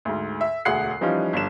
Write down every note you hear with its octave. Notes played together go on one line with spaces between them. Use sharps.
D2 G#2
E5
E1 D2 G#4 F#5 F#6 C7
E3 F3 G3 C#4 D#4 F4
G1 G3 D4 D5 E7